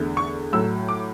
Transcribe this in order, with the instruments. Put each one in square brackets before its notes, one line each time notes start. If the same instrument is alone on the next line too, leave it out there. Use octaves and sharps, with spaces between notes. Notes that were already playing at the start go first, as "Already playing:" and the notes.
Already playing: [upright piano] E2 D3 A3
C#6
A2 F#3 A3 E6
D6